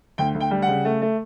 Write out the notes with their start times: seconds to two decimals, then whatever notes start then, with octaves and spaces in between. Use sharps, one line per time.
0.18 D2 G5
0.35 D2
0.40 G5
0.51 G3
0.62 F#5
0.68 C#3
0.85 A3
1.02 A3